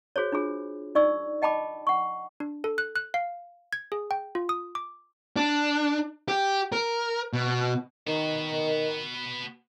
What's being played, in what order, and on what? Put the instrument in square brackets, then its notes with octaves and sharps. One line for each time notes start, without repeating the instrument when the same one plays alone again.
[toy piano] F#4 G#4 C5 C#5
D4 F4 G#4
D#4 D5 C#6 E6
D#5 G5 A5 B5 D6
F#5 C#6
[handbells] D4
A4
F#6
F#6
F5
G#6
G#4
G5
F4
D#6
D6
[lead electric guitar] D4
G4
A#4
B2
[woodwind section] D#3 [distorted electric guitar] B3 F#4